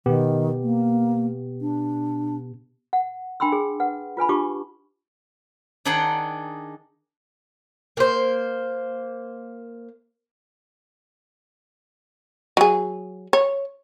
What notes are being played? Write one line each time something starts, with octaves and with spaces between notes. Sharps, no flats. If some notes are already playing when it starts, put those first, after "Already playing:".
B2 D#3 B3 G4
A#3
D4
F#5
D4 G5 B5 C6 E6
G#4
B4 F#5
F4 B4 G#5 B5
D4 F4 G4 A5 C#6 D6
D#3 D4 D#4 G#4 F#5 G5
A#3 C5
F#3 G#4
C#5